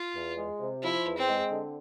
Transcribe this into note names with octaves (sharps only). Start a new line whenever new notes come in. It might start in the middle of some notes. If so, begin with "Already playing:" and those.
Already playing: F4
E2
G#3
C3
F3 E4
E2
C4
G#3
D3